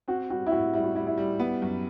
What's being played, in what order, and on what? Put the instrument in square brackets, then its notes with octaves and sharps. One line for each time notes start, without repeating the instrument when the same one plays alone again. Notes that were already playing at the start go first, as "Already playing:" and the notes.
[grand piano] C4 [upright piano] F#4
[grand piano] G3 [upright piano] F#4
[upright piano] E4
[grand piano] A2 [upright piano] F#4
[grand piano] G3 [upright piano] E4
[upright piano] F#4
[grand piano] G3 [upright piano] E4
[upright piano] E4
[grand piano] G3
B3
F#2